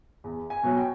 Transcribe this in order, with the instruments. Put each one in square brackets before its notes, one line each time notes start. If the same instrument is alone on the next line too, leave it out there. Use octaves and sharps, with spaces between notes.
[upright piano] E2
G#5
B2 F#3
G5